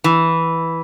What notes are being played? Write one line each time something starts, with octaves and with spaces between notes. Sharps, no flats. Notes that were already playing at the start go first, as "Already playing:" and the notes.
E3